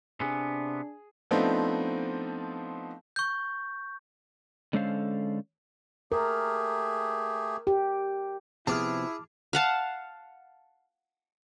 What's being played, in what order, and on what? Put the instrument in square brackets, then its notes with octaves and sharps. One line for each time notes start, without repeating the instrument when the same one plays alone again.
[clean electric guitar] C3 B3 [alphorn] D4 [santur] G#4
[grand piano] F3 A3 B3 C4 D4 D#4
[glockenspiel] C#6 G6
[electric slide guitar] D3 G#3 C#4 A4 C5 F5
[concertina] A3 G4 G#4 [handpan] A#4
[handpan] G4
[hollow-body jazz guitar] C3 F3 B3 [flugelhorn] E4 [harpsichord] G#4 [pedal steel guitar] A5 D6 F6
[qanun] F5 F#5 A5